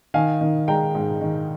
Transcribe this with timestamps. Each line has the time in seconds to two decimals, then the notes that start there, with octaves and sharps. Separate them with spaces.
0.14 D#3 F5 G#5
0.41 D#3
0.68 G#3 G5 A#5
0.95 G#2
1.21 D#3